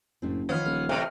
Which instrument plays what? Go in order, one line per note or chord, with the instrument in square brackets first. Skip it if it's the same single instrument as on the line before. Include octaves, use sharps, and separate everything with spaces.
[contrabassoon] F#1 [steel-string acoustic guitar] F#2 A2 C4
[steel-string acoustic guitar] D#3 F3 [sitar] B3 [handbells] C#5 F5 F6
[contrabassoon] D#1 [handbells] F6
[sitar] E2 A2 C3